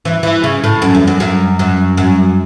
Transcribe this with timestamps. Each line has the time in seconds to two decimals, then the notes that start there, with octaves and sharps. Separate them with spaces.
0.05 E3
0.23 E3
0.44 C#3
0.64 A2
0.82 F#2
0.95 E2
1.07 F#2
1.20 F#2
1.59 F#2
1.97 F#2